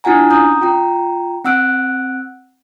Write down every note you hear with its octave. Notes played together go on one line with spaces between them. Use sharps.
D4 E4 F4 F#5 G#5 A#5
C#4 A#5 D#6 G6
F4 G5 A#5
C4 F#5 E6 F#6 D7